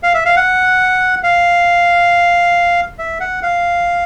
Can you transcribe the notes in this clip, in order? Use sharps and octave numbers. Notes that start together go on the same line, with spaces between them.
F5
E5
F5
F#5
F5
E5
F#5
F5